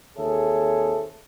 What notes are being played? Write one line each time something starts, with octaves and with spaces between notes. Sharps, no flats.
D#2 C4 G#4 A4 C#5 E5